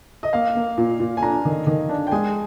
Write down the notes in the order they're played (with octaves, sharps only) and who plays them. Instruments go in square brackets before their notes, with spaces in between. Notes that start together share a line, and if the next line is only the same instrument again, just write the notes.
[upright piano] D#5
[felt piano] A#3 [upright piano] F5
[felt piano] A#3
A#2
A#2
[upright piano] G#5
[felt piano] D4 [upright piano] A#5
[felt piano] D#3
D#3
D4
[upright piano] G5
[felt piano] G#3 [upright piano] G#5